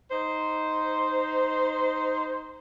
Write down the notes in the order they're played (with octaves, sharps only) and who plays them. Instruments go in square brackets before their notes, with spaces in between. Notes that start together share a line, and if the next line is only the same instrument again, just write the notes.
[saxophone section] D#4 C5